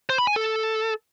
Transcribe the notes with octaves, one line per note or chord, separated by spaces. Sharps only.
C5
B5
G#5
A4